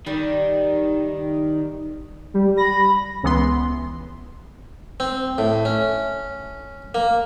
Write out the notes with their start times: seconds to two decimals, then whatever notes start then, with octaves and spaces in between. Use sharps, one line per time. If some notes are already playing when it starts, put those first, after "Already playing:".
0.07 D#3 G3
2.34 G3
2.57 B5 A#6
3.24 C#2 E3 B3 C6
5.00 C4
5.38 A2
5.65 C#4
6.95 A#3